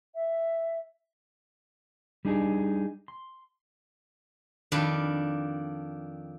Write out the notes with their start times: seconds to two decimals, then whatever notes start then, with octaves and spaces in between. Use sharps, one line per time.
0.14 E5
2.25 G3 D4 D#4 G#4
3.08 C6
4.72 F2 D#3 D4 B5